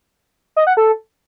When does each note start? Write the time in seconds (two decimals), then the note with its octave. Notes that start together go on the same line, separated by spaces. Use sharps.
0.56 D#5
0.67 F#5
0.77 A4